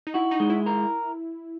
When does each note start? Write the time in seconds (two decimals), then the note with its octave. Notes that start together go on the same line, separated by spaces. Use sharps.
0.07 D#4
0.14 E4 F#4
0.31 D#4
0.40 G#3
0.50 E4
0.66 A#4